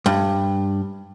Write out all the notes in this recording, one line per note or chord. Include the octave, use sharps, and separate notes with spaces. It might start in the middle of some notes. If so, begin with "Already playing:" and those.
G2